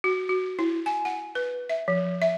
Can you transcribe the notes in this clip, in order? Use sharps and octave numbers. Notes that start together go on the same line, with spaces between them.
F#4
F#4
E4
G#5
F#5
B4
E5
F3
E5